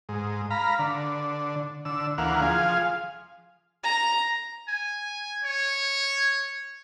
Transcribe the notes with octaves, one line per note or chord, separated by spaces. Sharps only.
G#2
F5 A#5 B5
D3
D3 E6
D2 E3 A#3 F5 F#5
F3 G#4 F5
A#5
G#5
C#5